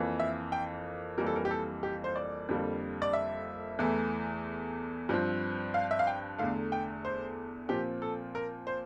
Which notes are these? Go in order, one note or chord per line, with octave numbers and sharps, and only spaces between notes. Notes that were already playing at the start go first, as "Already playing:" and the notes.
Already playing: F2 E3 A#3
E5
G5
F2 E3 G3 A#3 A#4
A4
A#4
G4
A4
G4
C5
D5
F2 D3 G3 A#3
D5
E5
E2 E3 A3
G2 F3 C4
F5
E5
F5
G5
E2 D3 A3 F5
G5
C5
A#2 F3 C4 G4
A4
A#4
C5